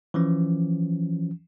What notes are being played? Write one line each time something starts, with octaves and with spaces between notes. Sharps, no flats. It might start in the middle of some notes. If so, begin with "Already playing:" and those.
E3 F3 C#4